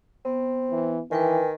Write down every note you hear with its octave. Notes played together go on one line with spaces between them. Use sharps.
B3 C4
E3
D#3 E3 B4 G5 G#5